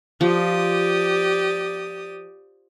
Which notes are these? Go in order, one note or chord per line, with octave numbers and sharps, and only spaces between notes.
F3 G4 D5 D#6